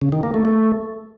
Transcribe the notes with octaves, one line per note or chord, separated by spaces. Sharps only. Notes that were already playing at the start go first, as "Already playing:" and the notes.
C#3
D#3
A#3
A3
A3